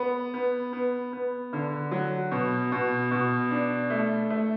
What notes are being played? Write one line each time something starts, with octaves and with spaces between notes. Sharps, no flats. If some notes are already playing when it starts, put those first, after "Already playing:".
Already playing: B3
B3
B3
B3
D3
F#3
B2
B2
B2
D4
A3
A3